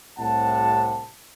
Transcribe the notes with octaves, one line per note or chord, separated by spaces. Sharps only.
C2 A2 C3 F#5 A5